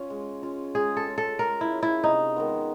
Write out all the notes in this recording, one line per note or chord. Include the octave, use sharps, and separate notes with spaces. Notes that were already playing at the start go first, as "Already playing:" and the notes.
Already playing: C#4 F4
G#3
C#4 F4
G#3 G#4
A4
C#4 F4
A4
G#3 A#4
E4
C#4 F4
E4
C3 D#4
D#3 G#3 B3